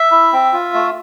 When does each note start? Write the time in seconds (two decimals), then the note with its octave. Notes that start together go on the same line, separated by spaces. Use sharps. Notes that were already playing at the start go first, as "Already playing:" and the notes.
Already playing: E5
0.11 E4
0.33 C4
0.53 F4
0.74 A3